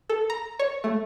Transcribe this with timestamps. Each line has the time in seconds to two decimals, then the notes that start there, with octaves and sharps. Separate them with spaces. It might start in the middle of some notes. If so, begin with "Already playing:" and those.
0.09 A4
0.30 A#5
0.59 C#5
0.84 A3